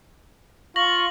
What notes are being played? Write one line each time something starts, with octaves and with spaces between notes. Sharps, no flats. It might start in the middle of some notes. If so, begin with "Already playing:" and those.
F4 C#6 A#6 F#7